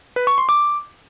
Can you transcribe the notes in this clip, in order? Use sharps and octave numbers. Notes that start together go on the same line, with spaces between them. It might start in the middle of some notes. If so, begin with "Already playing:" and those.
B4
C#6
C6
D6